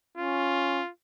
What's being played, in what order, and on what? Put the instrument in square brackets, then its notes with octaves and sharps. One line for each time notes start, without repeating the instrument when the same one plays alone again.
[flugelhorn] C#4 [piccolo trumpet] F4